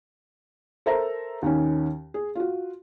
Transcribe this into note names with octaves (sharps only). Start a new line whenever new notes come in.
A4 A#4 C5 E5 A#5
D#2 D#3 C#4
G#4
F4 F#4